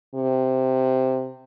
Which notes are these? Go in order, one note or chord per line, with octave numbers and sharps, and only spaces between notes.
C3